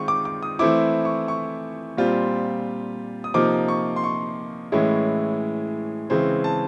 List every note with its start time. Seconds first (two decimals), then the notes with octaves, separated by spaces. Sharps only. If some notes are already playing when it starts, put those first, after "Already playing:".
Already playing: D#3 G#3 C4 F4 C#6
0.08 D6
0.25 D6
0.43 D#6
0.59 E3 A3 C4 E4 D6
1.05 C#6
1.28 C#6
1.97 A#2 G3 C4 F4
3.24 D#6
3.34 C3 F3 A#3 D#4 D6
3.68 C#6
3.96 C6
4.04 C#6
4.72 A2 E3 G#3 C#4 E4
6.10 C#3 E3 G#3 C4
6.44 A5